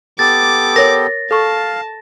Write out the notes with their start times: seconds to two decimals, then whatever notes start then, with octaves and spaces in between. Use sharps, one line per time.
0.19 B3 G4 A4 D6 A6
0.76 A#4 C#5 A#6
1.31 A4 F5 A5 C#6